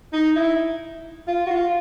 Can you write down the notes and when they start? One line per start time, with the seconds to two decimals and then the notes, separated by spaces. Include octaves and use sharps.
0.13 D#4
0.36 E4
1.28 F4
1.46 F#4
1.51 F4